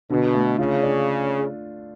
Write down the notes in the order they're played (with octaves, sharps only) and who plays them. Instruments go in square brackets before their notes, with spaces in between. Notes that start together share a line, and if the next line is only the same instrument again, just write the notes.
[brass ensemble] B2 [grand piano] D3
[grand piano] A3
[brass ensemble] C#3 [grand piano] F4
[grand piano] D4